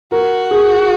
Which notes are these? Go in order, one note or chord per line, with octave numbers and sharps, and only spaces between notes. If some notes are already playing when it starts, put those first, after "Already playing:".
F#4 A#4
G#4